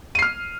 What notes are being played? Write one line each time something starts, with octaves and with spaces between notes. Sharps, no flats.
F6 C7 D#7